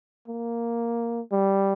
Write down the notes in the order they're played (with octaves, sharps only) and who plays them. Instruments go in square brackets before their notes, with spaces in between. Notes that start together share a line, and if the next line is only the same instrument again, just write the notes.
[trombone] A#3
G3